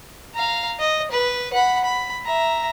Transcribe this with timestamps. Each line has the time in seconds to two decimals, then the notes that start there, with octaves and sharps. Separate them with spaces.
0.34 F5 A#5
0.79 D#5
1.11 B4
1.53 F#5 B5
1.84 B5
2.25 E5 A#5